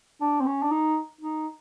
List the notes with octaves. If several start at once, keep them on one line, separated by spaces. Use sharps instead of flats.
D4
C4
C#4
D4
D#4
D#4